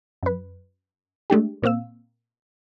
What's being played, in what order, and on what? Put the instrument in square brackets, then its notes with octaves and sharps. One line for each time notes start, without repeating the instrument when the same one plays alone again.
[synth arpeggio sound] F#2 B4
G#3 A3 D4 G4
A#2 A#3 C4 F5 E6